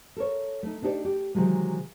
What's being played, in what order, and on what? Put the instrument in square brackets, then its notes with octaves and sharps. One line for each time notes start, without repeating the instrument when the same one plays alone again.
[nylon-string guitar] A4 A#4 C#5
A3 D#4
D4 D#4 G4 C5 D5
G4
C3 D#3 E3 F#3 G#3